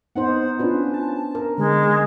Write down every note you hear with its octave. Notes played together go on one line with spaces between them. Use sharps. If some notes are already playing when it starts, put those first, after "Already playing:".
B3 D#4 C5 F#5
C#4 D4 F4 B4
A5
A#4
D3 G#3